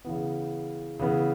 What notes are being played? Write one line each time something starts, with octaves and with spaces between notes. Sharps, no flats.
C#3 E3 B3
C#3 E3 B3